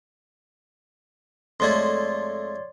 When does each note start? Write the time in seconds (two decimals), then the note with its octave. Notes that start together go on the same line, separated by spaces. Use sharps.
1.60 F2 G#3 A3 C#5 D5 C6